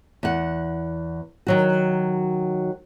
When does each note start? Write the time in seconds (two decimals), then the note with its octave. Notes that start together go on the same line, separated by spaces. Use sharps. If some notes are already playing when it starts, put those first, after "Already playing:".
0.23 E2 F#5
1.47 D#3 F#3 F#4